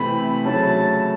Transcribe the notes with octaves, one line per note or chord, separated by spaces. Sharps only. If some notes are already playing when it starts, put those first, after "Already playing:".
Already playing: C3 E3 A3 C4 B5
C#3 F#3 A3 A5